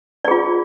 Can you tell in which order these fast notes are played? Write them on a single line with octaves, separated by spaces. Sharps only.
D5 G#4 F4